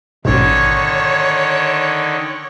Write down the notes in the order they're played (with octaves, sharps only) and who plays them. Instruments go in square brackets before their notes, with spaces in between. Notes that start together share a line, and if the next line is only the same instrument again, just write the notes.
[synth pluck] A1 G#2 B2 [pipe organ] D3 D#3 [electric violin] C#5